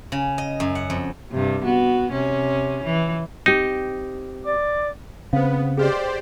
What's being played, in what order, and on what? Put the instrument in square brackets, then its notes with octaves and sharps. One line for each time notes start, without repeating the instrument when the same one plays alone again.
[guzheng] C#3
D#5
F#2
F#5
F2
[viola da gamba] G2 C3
B3 F#4
C3 C#4
E3
[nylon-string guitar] C4 G4 [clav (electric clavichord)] D#4
[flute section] D5 D6
[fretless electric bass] C#3 C4 [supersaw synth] B3 [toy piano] C5 F5
[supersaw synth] G4 C5 D5 [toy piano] G#4 B4 D#5